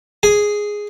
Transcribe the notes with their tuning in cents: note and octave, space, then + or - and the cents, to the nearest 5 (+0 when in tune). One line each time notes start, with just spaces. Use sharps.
G#4 +0 G#5 +0